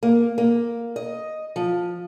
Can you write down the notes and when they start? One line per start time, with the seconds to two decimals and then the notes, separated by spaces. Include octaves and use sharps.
0.03 A#3
0.38 A#3
0.96 D#5
1.56 F3